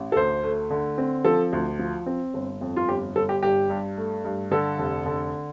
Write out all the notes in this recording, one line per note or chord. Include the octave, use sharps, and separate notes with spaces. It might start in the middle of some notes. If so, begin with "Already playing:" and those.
Already playing: A1
A4
D2 C5
A3
D3
C4
F3 A4
D2
F3
C4
G1
F2
F4
G1 G4
G1 A4
G4
G2 G4
G2
A3
G2
D3 A4
F1
D3